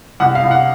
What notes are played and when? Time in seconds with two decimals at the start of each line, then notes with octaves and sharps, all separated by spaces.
0.20 C2 F#5
0.35 F5
0.44 C2
0.51 F#5